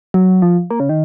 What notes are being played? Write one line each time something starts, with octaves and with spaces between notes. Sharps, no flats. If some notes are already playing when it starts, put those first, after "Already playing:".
F#3
F3
A#3
C#3
D#3